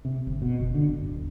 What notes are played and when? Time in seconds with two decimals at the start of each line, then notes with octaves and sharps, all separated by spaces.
0.05 C3
0.27 G1
0.42 B2
0.59 F#1
0.74 D3
0.88 G1
1.09 D#1